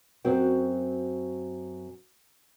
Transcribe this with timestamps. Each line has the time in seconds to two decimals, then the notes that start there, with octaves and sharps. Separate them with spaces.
0.25 F#2 C4 F#4